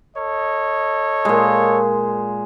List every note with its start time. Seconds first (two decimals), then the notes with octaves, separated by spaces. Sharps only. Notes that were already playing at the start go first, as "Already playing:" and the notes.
0.16 A4 C#5 D#5
1.25 A#2 G#3